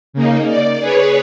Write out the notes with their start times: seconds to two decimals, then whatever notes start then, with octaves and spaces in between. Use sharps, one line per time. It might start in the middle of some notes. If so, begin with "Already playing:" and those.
0.13 C#3 A#3 D#4
0.48 D5
0.80 G#4 B4 C#5